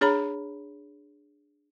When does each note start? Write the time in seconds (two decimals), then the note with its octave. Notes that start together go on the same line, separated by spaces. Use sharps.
0.01 D4 G#4 C#5 A#5 B5